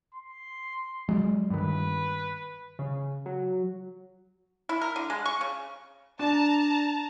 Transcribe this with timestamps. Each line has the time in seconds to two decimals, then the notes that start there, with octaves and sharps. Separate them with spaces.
0.14 C6
1.09 F#3 G#3
1.50 G2 D#3 B4
2.79 C#3
3.26 F#3
4.69 E4
4.81 A#4
4.96 D3
5.10 G#3
5.26 C#6
5.41 C#3
6.19 D4 A5 A#5